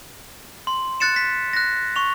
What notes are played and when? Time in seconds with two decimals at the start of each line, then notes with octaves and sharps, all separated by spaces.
0.67 C6
1.00 F#6 A6 C#7 E7
1.16 B6
1.53 F#6 A#6
1.96 C#6 F7